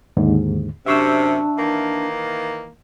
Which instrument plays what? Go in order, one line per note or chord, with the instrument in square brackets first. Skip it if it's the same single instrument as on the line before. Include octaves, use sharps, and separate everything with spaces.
[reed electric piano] D#2 G#2 D3
[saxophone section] F#2 C3 [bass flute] D4 [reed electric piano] E5 C#6 E6
[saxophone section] D#3 E3 A#3